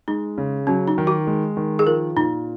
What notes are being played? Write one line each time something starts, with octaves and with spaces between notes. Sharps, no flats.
G#3 D#4
C#3
F#3 C#4
D#4
D#3
F#4
G#3
D#3
G#4
F3 A#4
A#2 D#4